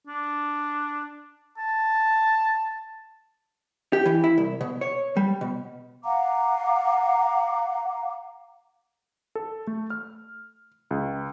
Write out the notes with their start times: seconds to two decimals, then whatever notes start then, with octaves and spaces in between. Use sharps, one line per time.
0.07 D4
1.58 A5
3.93 G4
4.05 E3
4.24 E4
4.38 C2
4.61 B2
4.81 C#5
5.17 G3
5.41 B2
6.04 F5 F#5 A#5 D6
9.35 A4
9.67 A3
9.90 F6
10.91 C#2